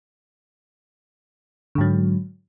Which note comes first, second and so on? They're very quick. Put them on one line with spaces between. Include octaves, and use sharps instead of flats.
D3 G#2 F#3